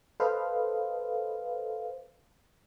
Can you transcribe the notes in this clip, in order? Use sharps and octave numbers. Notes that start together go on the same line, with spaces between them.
A4 B4 C5 D#5 F5